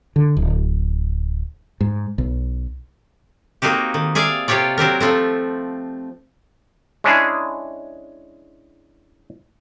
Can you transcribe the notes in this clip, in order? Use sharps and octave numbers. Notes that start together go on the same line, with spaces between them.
D3
D1
G#2
B1
A#3 C4 D#4 F#4 G4
D#3
G#4 D5 E5 F5
C3 F4 G4 C#5 D5
F#3 C4 G4 A#4
F3 A3 C4
G#3 C#4 D4 E4 G#4